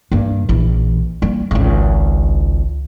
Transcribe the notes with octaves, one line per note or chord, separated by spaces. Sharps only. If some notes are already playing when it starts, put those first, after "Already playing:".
G2 A#3
A#1 E3
G3 A#3
G#1 C#2